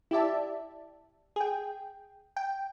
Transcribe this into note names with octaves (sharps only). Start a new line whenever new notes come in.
E4 G4 D5 E5 A5
G#4 G5
G5